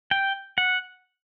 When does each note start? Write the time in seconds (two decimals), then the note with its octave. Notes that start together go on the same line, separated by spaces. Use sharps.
0.11 G5
0.58 F#5